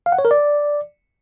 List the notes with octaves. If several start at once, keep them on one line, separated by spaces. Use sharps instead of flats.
F5
F#5
C#5
A#4
D5